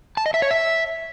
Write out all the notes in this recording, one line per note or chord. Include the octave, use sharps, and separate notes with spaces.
A5
D#5
E5
C#5
E5